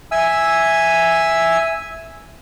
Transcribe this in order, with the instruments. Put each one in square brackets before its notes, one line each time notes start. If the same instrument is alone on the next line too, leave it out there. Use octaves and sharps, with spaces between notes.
[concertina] E5 G#5 E6